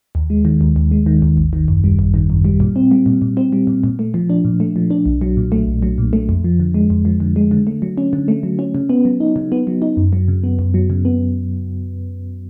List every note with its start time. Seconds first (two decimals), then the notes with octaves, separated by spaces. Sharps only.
0.15 D#2
0.30 G#3
0.45 D#3
0.61 D#2
0.76 D#2
0.91 G#3
1.06 D#3
1.22 D#2
1.37 G#1
1.53 D#3
1.68 F#2
1.84 G3
1.99 G#1
2.14 D#3
2.30 F#2
2.45 G3
2.60 A#2
2.76 C4
2.91 G3
3.06 A#2
3.22 A#2
3.37 C4
3.53 G3
3.67 A#2
3.84 A#2
3.99 A3
4.14 F3
4.30 D4
4.45 A#2
4.60 A3
4.76 F3
4.90 D4
5.06 B1
5.21 F#3
5.37 A#2
5.52 A3
5.67 B1
5.83 F#3
5.98 A#2
6.13 A3
6.29 F2
6.44 F3
6.60 D3
6.74 G#3
6.90 F2
7.05 F3
7.20 D3
7.36 G#3
7.51 D3
7.67 A3
7.82 F#3
7.97 C#4
8.13 D3
8.28 A3
8.43 F#3
8.59 C#4
8.75 C#3
8.90 B3
9.05 F#3
9.20 D#4
9.36 C#3
9.52 B3
9.67 F#3
9.82 D#4
9.97 F#2
10.13 F#3
10.28 C#3
10.44 B3
10.59 F#2
10.74 F#3
10.90 C#3
11.05 B3